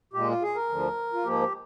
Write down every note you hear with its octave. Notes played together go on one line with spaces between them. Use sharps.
A#2 G#3 G4
F4
G#4
A#4
D2 D3 F3
F4
G#2 F3 A#3 G4